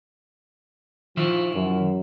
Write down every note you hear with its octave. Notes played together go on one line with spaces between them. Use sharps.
D#3 F3 E4 F4
F#2